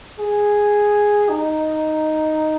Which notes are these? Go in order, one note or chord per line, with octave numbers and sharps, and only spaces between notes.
G#4
D#4